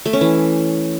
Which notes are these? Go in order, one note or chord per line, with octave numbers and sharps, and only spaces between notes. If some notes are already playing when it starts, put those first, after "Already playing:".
A3
C#4
E3